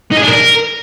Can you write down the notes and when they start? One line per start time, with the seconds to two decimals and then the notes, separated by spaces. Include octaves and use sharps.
0.12 D#4
0.17 G#4
0.23 D4
0.28 A#4